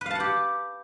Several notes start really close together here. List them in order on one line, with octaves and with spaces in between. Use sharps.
B4 F5 A5 F#5 G4